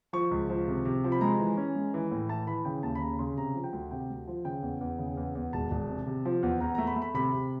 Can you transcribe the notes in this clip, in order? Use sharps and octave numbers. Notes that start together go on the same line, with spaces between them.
F3 C#6
C#2
F3
C3
C3
F3
B5
G#3 A#5
E3
C#4
G#3
E3
A2
E3 A5
E3 B5
C#3 G5
D#2 A5
B5
C#3 A#5
C#3 C6
C3 A#5
F3
G5
D2
C3 G5
D2
F3
C#3 G5
E2
E2
C#3
E2
E2
E1 A5
E1
C3
C3
F3
E2
E2 A#5
A3 A#5
B5
A3
B5
C3 B5
C3